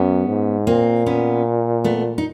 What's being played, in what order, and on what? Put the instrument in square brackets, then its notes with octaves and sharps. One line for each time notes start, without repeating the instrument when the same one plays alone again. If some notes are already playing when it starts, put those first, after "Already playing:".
Already playing: [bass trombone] F#2 [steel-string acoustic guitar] B3 C#4
[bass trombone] G#2
[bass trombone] A#2 [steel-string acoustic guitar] A#3 C4
[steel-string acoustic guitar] B3 C#4
A3 B3
D#4